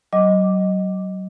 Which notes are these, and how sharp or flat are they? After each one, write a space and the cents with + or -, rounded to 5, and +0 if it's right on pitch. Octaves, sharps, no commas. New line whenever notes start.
F#3 +35 D#5 +0 D6 +0